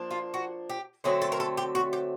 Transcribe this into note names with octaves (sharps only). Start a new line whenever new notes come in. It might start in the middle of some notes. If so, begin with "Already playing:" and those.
Already playing: F3 A#3 D4
F4
F#4
G4
D3 F#3 A3 C4 G#4
A4
A#4
A4
G4
F#4
G4